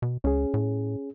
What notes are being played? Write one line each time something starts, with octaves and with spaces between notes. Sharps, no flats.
B2
C#2 C#4 G#4
A2